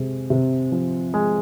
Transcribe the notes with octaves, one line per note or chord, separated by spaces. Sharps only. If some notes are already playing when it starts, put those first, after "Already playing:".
Already playing: C3 G#3
C3
F3
G#3